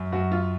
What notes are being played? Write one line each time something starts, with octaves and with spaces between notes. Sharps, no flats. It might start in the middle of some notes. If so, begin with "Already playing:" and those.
Already playing: F#2
F#2 F#4
F#3 F4